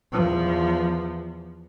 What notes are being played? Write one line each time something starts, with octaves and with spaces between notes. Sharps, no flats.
E2 F3